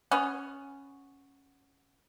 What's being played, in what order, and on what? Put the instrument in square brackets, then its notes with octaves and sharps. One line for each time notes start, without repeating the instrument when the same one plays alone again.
[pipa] B3 C#4